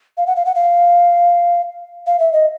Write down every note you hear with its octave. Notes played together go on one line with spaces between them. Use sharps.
F5
F#5
F5
F#5
F5
F5
E5
D#5